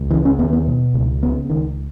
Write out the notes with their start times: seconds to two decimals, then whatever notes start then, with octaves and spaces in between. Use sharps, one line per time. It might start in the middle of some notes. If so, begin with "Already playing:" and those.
Already playing: C#2
0.11 C#3 E3
0.25 C#4
0.39 D#2 B3
0.53 B3
0.67 B2
0.94 C#2
1.22 C#3 B3
1.50 C#2 D#3